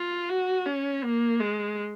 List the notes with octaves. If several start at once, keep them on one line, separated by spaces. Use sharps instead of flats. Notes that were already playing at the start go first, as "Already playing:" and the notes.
Already playing: F4
F#4
C#4
A#3
G#3